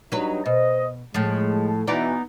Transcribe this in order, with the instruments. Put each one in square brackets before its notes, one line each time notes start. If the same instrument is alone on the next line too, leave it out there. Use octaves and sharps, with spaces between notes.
[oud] F#3 B4 [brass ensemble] G3 D4 D#4
[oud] B2 [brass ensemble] C5 D#5
[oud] A2 F3 [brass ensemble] G#3
[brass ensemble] B2 E3 [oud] B3 D#4 D5